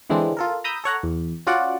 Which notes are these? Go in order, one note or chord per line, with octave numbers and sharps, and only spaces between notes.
D3 E3 G#3 C4 D4
F4 A4 A#4
A#5 B5 D#6 E6 G6
A4 C#5 F#5 A#5
E2
C#4 F4 F#4 D5 F#5